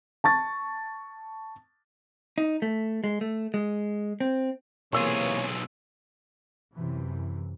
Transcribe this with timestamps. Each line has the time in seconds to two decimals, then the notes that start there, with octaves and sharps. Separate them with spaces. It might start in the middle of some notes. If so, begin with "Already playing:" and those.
0.24 A5 C#6 A6
2.38 D#4
2.62 A3
3.04 G#3
3.21 A3
3.54 G#3
4.20 C4
4.93 B1 C3 E3 A#3 G#4 C#5 C6 E6
6.74 F#2 C3 E3